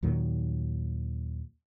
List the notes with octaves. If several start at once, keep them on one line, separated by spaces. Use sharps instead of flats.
D#2 A#2 D#3 F#3